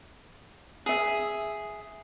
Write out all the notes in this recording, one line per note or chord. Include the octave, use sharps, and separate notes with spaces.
G#4 E5